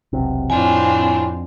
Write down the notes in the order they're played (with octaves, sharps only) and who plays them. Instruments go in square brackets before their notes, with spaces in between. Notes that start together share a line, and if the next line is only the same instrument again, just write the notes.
[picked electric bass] E1 B1 C3
[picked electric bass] F2 [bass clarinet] A2 [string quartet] C4 D4 F4 [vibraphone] G#5